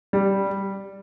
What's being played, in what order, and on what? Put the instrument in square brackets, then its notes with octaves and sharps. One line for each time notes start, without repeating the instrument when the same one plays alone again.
[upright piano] G3